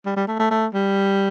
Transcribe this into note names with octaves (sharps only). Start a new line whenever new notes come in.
G3
G3
A3
A3
A3
G3